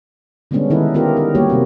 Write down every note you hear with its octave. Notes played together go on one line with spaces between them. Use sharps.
D3 G3 G#3 B3 C#4 D4
D#3 D#4 E4 A4 B4
B3 C#4 D#4 F4 G4 A#4
A#4
G3 A#3 F#4 G4 C#5
C3 A#3 C4